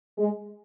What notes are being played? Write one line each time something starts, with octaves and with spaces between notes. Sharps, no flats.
G#3